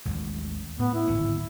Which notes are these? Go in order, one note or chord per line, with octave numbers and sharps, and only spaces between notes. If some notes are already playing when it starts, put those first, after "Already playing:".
A1 D#2 G#3
A2 B3
E4
D1 G#1 B3